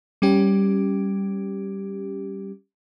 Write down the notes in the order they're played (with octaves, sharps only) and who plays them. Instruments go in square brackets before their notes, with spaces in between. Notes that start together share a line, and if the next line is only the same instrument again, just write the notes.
[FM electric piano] G3 C#4 G4